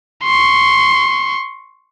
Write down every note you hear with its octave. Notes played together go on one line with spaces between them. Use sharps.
C6 C#6